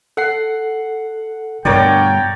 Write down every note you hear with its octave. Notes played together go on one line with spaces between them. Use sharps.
A4 F#5 C7
G2 B2 D3 A#4 C#5 D5 G5